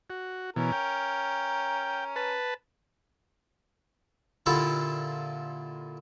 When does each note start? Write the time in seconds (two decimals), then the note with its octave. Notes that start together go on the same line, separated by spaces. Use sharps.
0.10 F#4
0.56 B2 E3 C#4 A#4
0.72 G5
2.16 B4 A5
4.46 A#2 D3 E4 F4 G4 A4